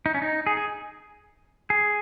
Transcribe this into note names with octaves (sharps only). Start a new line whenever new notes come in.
D#4
C#4
D#4
G#4
G#4
G#4